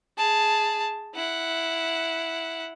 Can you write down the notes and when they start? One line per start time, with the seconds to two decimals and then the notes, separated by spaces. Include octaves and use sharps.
0.17 G#4 A5
1.14 E4 F#5